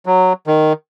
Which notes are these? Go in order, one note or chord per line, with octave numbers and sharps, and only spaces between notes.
F#3
D#3